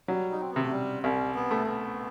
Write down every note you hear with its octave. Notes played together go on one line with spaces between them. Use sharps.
F#3 G3
D#4
C4
C3 B3
A3
G3
C2 G3
B3
A3
B3